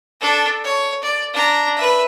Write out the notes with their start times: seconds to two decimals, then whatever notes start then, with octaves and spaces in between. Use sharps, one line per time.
0.21 D4 A4
0.64 C#5
1.03 D5
1.33 D4 A#5
1.77 B4 E5